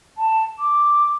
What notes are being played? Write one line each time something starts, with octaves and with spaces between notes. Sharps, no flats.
A5
D6